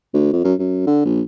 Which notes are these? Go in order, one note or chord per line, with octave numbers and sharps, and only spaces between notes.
D2
F2
F#2
F#2
D3
A#1